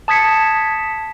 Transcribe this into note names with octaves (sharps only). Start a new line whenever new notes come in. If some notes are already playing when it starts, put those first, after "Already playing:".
A5 D#6 G#6 B6 C#7